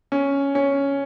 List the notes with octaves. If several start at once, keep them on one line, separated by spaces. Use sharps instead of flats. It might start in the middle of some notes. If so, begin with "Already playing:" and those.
C#4
C#4